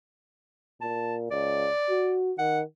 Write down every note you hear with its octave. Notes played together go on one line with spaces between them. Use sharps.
A#2 A5
C#2 D5
F#4
D#3 F#5